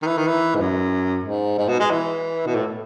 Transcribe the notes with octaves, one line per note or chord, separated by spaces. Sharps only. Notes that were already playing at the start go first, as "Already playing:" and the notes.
D#3
E3
D#3
E3
G#2
F#2
G#2
G#2
B2
G#3
E3
B2
A2